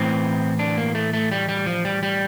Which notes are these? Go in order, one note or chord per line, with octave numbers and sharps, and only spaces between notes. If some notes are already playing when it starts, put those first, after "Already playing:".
Already playing: A2 E3 C4
D4
A#3
A3
A3
G3
G3
F3
G3
G3